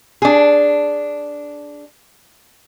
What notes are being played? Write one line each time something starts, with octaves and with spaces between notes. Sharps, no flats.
D4 G#4